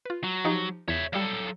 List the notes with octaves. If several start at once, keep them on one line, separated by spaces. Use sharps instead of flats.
F4 B4
F#3
F3 D#4 G4
E2 C#5 E5
F#3 G3 A4 D5 F5